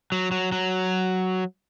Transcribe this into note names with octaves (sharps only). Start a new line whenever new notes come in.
F#3
F#3
F#3